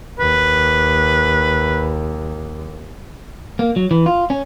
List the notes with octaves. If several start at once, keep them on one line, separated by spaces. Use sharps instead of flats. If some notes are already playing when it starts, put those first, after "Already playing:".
D#2 B4
A#3
F#3
E3
F4
C#4